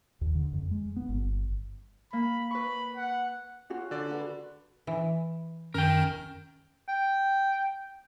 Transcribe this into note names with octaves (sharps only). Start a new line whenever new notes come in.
D#2
D3
F2
G#3
B3
G1
A#3 B5
B4 B5 C#6
F#5
C#4 F4 F#4
D3 D5
F#4 B4
E3
F#2 D#3 C#4 A#4 G5
G5